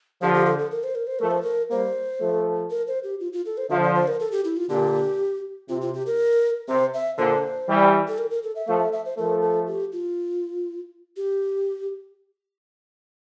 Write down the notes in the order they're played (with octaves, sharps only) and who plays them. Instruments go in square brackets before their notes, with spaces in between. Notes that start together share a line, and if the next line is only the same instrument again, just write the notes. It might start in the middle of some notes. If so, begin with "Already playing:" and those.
[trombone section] D3 F3 [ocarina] G4
[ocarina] G4
A4
A4
A#4
C5
A#4
C5
[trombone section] F3 A3 [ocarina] A#4
[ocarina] C5
A#4
[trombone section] G3 A#3 [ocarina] C5
[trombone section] F3 A3
[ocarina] A#4
C5
G4
F4
F4
A4
C5
[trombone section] D3 F3 [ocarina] E5
[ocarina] D5
C5
A#4
A4
G4
E4
F4
[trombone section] A#2 D3 [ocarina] G4
[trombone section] C3 [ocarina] F4
[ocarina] F4
G4
A#4
[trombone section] C3 [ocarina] C5
[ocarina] E5
[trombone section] A#2 D3 [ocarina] C5
[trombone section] E3 G3
[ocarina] A4
A#4
A#4
A4
E5
[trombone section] F3 A3 [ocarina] F5
[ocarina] E5
E5
C5
[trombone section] F3 A3 [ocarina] A#4
[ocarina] A4
G4
F4
G4